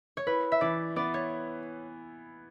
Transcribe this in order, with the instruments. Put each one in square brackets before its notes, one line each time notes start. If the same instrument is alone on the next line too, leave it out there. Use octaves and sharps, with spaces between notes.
[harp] C#5
[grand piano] E4 [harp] B4
[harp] E5
[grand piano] E3 [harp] D5
[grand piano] B3 [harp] D5
[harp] C#5